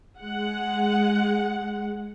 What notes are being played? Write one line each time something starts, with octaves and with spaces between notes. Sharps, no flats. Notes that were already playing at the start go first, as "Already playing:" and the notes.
G#3 F#5